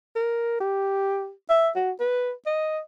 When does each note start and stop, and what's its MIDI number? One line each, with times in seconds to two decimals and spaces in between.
0.16 0.58 70
0.60 1.32 67
1.50 1.70 76
1.76 1.92 66
2.00 2.33 71
2.47 2.80 75